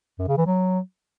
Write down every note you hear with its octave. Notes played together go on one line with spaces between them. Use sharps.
F#2
C#3
E3
F#3